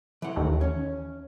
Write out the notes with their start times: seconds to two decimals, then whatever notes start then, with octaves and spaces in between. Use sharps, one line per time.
0.22 E3 F#5
0.36 D#2 A3
0.61 C#4 C#5